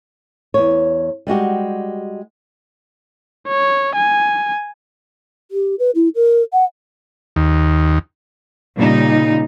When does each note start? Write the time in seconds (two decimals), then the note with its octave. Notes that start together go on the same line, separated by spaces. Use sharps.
0.54 E2 C#5
1.27 G3 G#3 F#4 G4
3.47 C#5
3.95 G#5
5.51 G4
5.79 B4
5.95 E4
6.15 A#4
6.53 F#5
7.36 D#2
8.77 A#2 C#3 G3 D#4